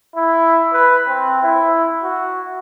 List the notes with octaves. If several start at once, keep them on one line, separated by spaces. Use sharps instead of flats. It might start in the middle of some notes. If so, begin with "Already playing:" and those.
E4
B4
C4
E4
F#4